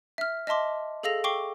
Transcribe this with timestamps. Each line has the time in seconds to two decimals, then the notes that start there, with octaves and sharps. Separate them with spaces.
0.18 E5 F6
0.47 D#5 E5 A5 C6 D6
1.03 G#4 A4 F5 E6 A#6 F7
1.24 G5 C#6 D6 C7 G7